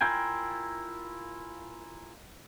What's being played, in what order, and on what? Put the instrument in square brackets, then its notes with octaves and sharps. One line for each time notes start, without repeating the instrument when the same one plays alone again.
[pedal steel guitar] E4 F4 A#4 G5 G#5